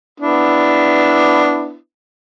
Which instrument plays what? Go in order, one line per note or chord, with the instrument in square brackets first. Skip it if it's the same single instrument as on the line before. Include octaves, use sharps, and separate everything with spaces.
[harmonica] B3 D4 E4